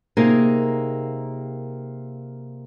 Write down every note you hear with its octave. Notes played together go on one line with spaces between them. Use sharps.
C3 A#3 D#4 F4 G#4 A#4